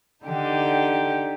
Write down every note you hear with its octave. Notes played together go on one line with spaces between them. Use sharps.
D3 D#4 G4